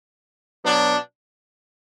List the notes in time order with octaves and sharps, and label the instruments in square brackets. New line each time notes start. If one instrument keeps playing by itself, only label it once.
[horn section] B2 F#3 B3 D4